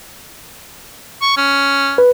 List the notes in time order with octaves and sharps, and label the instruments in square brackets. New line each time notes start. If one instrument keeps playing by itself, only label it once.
[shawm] C#6
C#4
[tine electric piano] B4